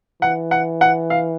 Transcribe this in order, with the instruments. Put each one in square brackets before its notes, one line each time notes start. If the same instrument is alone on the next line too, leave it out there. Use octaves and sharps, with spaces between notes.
[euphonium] E3 [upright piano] F#5
[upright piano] F#5
F#5
F5